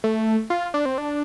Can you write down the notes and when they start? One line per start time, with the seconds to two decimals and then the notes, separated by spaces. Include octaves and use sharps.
0.04 A3
0.50 F4
0.74 D4
0.85 C4
0.98 D4